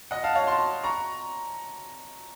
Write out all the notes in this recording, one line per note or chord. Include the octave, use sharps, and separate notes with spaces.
D#5 F#5
F5 A5
C#5 F5
A5 C6
A#5 C#6